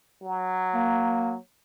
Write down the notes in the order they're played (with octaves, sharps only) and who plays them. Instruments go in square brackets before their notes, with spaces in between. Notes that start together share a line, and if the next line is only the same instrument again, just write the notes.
[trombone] F#3
[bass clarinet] A#3